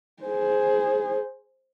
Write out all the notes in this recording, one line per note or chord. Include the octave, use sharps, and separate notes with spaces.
G#4 C5